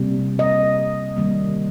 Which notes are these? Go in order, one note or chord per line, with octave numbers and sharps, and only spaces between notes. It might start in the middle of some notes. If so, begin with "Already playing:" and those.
Already playing: C3 G3 A#3
D#5
D#3 G3 A#3